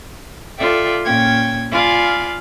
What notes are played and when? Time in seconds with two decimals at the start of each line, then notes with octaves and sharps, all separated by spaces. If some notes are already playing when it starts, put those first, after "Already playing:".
0.57 F4 A4 D5 E5 G5
1.04 A#2 C#4 G5 G#6
1.71 F4 D5 F5 G#5 B5